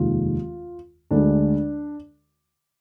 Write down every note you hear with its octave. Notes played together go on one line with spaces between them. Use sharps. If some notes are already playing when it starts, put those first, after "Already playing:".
Already playing: F1 D#2 D#3 G#3 F4
D2 D3 G#3 D4